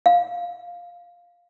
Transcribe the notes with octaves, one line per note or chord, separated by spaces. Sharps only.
F5